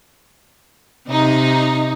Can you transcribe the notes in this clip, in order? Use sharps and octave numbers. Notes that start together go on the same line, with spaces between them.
C3 D#4